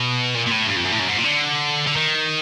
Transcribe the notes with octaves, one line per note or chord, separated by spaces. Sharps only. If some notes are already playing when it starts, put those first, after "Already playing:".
Already playing: B2
A#2
A#2
A2
G2
F2
F#2
A2
F#2
G#2
A#2
D3
D3
D#3